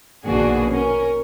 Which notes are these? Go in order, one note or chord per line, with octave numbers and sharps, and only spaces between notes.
A#1 D#2 B2 D4 F#4 G#4
C#4 A#4